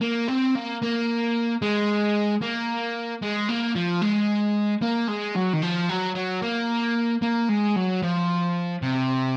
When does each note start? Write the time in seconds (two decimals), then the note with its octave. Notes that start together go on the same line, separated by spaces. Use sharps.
0.01 A#3
0.28 C4
0.55 A#3
0.82 A#3
1.62 G#3
2.42 A#3
3.22 G#3
3.49 A#3
3.75 F3
4.02 G#3
4.82 A#3
5.09 G#3
5.36 F#3
5.53 D#3
5.62 F3
5.89 F#3
6.15 F#3
6.42 A#3
7.22 A#3
7.49 G#3
7.76 F#3
8.02 F3
8.82 C3